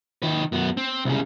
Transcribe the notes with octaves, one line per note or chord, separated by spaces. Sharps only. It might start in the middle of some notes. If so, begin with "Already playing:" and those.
D#3 B4
F#2 B3
C4
C2 C#3